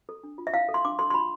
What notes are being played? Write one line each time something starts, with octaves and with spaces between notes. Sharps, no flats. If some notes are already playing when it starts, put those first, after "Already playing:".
A4
D4
F4
E5
E4 F5
A4
C6
D4 D6
A4 C6
C6
F4 B5